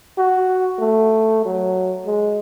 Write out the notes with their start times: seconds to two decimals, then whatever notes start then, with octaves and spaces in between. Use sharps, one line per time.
0.18 F#4
0.79 A3
1.45 F#3
2.06 G#3